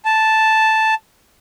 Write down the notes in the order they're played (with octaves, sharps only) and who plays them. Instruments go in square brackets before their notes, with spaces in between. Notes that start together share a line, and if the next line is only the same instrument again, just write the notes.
[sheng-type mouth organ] A5